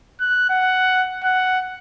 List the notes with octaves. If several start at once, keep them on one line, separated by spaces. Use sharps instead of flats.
F#6
F#5
F#5